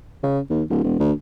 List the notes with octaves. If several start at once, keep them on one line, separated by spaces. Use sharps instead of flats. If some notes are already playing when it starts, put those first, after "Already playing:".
C#3
D#2
D1
E1
D2